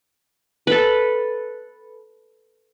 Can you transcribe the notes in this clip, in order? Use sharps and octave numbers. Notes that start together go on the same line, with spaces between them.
A4 B4